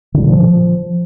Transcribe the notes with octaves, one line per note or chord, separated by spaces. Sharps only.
D3
G3
A#2
F3